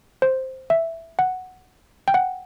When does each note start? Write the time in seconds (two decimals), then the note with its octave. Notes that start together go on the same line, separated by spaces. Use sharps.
0.22 C5
0.70 E5
1.19 F#5
2.08 G5
2.14 F#5